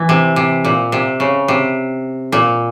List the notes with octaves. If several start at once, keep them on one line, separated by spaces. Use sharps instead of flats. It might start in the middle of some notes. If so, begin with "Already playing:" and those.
Already playing: E3
C3
C3
A#2
C3
C#3
C3
A#2